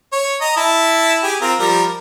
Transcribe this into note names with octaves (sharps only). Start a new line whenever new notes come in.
C#5
D#5 A#5
E4 A5
G4 G#4
C4 F4 A#4
F3 G3 A#4